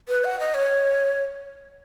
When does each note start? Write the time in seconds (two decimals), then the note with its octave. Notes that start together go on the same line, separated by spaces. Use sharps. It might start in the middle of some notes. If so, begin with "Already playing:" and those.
0.08 B4
0.24 F#5
0.40 D#5
0.54 C#5